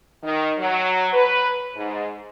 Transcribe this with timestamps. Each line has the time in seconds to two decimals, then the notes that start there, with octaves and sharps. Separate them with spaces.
0.23 D#3
0.58 F#3
1.13 B4
1.75 G#2